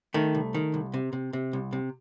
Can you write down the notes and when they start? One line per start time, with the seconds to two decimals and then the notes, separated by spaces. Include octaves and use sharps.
0.14 D#3 A3
0.35 C2
0.54 D#3
0.74 C2
0.94 C3
1.13 C3
1.33 C3
1.53 C2
1.73 C3